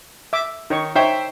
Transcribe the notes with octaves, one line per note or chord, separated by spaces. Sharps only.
E5 D6
D#3 D#4 C#5 C#6
D#4 C5 C#5 E5 G5